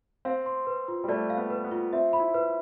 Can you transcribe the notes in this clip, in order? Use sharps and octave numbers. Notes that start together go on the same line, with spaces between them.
C4 F5
C6
B4
F4
G3
A3 D5
F5
B3
B4
B3
F4
C4 E5
B5
E4
B4